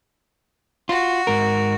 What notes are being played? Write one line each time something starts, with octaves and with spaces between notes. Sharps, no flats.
F4 F#4
G#2 A#4